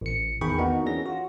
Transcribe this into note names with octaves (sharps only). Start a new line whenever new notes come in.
A1 C#7
E2 D#3 G#4 G5 B5 C#6
A#3 B3 D4 D#4 F#4
E3 C#4 G#4 A#6
F4 F#4